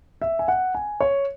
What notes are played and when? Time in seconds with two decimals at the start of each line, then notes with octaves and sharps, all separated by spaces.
0.22 E5
0.39 G#5
0.48 F#5
0.75 G#5
1.00 C#5